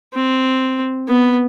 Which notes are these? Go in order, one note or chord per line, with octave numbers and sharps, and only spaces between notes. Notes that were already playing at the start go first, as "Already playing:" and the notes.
C4
B3